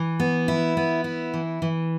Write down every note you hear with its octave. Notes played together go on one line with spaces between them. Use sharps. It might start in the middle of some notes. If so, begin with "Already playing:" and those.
Already playing: E3
B3
E4
B3
E4
E3
E3